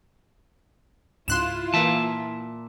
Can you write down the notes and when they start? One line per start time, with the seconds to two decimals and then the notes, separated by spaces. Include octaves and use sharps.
1.28 C#2 G#2 C#3 E4 F4 C6 F#6 E7
1.74 A#2 E3 A#3 E5 A5